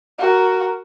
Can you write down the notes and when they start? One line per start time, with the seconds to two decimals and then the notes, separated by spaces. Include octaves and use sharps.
0.18 F#4 A#4